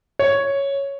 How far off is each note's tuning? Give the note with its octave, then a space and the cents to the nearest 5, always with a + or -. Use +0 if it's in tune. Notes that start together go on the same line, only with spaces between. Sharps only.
C#5 +0